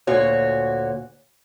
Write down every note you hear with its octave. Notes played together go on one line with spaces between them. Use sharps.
D2 A#2 F#4 C#5